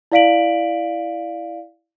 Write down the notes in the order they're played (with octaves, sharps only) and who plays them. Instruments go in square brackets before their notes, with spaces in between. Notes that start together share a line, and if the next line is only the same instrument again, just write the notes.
[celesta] E4 D5 F5 B6 D7 F#7